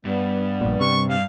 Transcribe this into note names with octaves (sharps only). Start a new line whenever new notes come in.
G2 G3 B3
A#1 A#2
C3 C#6
G2 F5